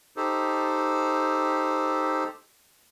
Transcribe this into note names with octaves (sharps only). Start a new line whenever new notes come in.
D#4 G4 A4 C5